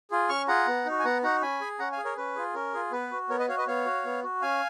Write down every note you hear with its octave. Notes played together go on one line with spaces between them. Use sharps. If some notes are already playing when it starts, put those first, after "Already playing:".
F4 G#4
C#4 C#6 F6
F4 G#4 F#5 A#5
B3
D#4 F#4
G#5
B3 F#5 A#5
D#4 F#4 F#5 A#5
C#4 G#5 B5
G#4
C#4 F#5 A#5
F5 G#5
G#4
A#4 C#5
C#4 B4
F4 G#4
C#4 A#4
F4 G#4
B3 B4
F#4
B3 A#4 C#5
B4 D#5
F#4 C#5 F5
B4 D#5
B3 C#5 F5
F#4
B3
F#4
C#4 F5 G#5